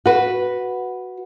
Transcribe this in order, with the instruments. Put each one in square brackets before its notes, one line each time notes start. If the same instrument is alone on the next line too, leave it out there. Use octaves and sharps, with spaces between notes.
[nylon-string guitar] F#4 B4